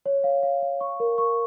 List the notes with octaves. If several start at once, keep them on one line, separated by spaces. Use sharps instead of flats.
C#5
F5
F5
F5
C#6
A#4
C#6